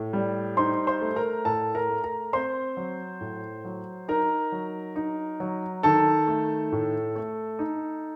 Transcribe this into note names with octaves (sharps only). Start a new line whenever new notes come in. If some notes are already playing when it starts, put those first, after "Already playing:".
Already playing: A2
G3
D#4 C5 C6
C5 C6
A3
A#4 A#5
A2 A4 A5
A#4 A#5
A3
A#4 A#5
C4 C5 C6
F#3
A2
F#3
D#4 A#4 A#5
F#3
D#4
F#3
D#3 A4 A5
A3
A2
A3
D#4